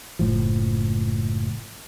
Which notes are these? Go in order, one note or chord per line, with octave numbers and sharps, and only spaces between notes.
F#1 A2 F3